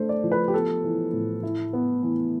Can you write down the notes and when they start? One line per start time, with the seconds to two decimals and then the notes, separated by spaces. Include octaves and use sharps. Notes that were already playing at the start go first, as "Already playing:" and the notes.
Already playing: A3 D4 C5
0.09 D5
0.24 F3
0.32 B4
0.48 G4
0.54 B3 A4
0.84 E3
1.13 A2
1.43 E4
1.73 B3
2.03 E3